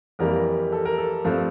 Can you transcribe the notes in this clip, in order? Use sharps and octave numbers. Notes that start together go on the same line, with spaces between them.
F2 E3 G3 A#3 A#4
A4
A#4
A4
G2 F3 A3 C4